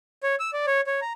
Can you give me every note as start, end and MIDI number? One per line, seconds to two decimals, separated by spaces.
0.23 0.35 73
0.40 0.51 88
0.53 0.66 74
0.67 0.81 73
0.87 1.00 73
1.02 1.13 82